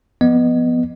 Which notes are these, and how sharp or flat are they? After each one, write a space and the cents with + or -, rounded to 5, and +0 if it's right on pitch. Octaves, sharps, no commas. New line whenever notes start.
F3 +0 B3 +0 D#5 -20